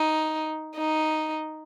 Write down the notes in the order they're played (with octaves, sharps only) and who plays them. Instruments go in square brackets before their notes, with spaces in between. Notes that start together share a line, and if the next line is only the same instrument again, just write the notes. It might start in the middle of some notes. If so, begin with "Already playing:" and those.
Already playing: [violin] D#4
D#4